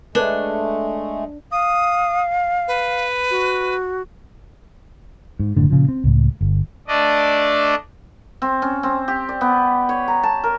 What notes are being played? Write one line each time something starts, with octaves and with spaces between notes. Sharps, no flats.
G#3 A3 D4 A4 B4 C#5
F5 D#6
B4
F#4
G#2
F#1 A2 D3
A#2 C#3 F3
C4
C#2 A2
G1
A3 D4 D5 D#5
C4
C#4
C4
G4
D5
B3
C#5
A#5
A5
A#4